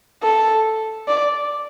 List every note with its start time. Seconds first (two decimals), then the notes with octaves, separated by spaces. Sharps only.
0.23 A4
1.08 D5